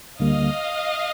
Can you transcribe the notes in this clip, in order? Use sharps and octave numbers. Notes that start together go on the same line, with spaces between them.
D2 D3 G3 A#3 D#5 F5